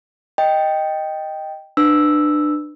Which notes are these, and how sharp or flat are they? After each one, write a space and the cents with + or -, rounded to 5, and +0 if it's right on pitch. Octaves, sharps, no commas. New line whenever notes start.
D#5 +0 G5 +0
D4 +30 B4 +10 E6 +0